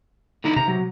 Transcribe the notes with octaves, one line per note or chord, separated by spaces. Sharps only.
D3 D#4 E4
C3 A#5
F#3